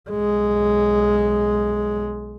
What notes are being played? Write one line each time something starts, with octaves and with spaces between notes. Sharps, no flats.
B1 G#3